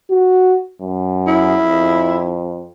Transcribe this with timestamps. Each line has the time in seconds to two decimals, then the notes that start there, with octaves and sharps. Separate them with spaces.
0.11 F#4
0.81 F#2
1.27 E4
1.63 F2